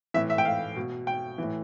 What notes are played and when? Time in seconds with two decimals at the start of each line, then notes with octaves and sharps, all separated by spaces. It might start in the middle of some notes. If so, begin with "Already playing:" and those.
0.14 A2 E3 E5
0.30 E5
0.38 G5
0.45 F5
0.76 B2
1.07 G5
1.38 A2 E3